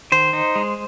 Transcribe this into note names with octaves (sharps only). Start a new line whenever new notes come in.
D#3 C5
D#4
G#3